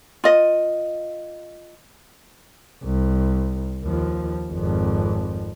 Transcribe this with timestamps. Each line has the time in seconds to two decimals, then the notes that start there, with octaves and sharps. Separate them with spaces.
0.24 F4 D#5
2.84 C2
3.84 D#2 F3
4.52 G#1 F2